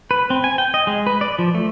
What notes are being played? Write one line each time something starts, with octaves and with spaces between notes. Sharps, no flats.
B4
C4
G#5
G5
D#5
G#3
B4
D5
F3
A3